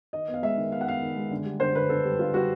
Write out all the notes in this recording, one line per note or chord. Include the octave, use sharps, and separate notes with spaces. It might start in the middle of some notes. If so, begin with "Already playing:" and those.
D#3 D#5
B3
F5
G#3 E5
D#3
B3 F5
F#5
B3 F5
D#3
G#3
D3
G3
D3 C5
D3 B4
D3 A4
G3
D3 F4
G3 F#4